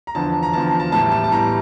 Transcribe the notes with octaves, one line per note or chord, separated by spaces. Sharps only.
A#5
E2 D3 F3 A5
A#5
E2 D3 F3 A5
A#5
A5
A2 E3 G3 A5
A5
A5
A2 E3 G3 A#5